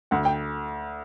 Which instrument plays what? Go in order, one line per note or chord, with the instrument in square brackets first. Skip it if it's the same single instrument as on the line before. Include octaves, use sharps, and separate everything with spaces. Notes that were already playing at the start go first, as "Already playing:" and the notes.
[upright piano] D2 [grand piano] F#5
[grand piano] G5